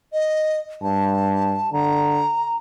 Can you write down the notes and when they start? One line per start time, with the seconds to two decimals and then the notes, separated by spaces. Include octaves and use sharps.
0.13 D#5
0.82 G2 A5
1.73 D3 A#5